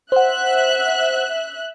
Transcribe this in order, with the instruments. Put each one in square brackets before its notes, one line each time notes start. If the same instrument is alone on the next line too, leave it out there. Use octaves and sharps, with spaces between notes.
[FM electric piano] C5 F#5 [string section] E5 F#6